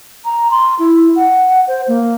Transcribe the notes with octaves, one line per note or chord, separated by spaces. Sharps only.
A#5
C6
E4
F#5
C5
A#3